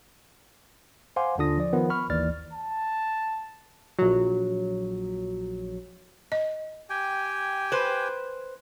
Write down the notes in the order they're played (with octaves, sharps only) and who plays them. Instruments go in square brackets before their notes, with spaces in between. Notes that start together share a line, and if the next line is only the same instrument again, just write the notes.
[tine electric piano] C5 F5 F#5 G#5 C6 D6
D#2 D3 D4 F4 D#6 A#6
F3 D5
D#3 F3 B3 A#4
B5 C#6 F6
G1 D#2 E3 D5 F6 A6
[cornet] A5
[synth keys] A#1 F#3
[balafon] D#5
[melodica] G4 G5 G#5
[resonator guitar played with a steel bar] B4 C5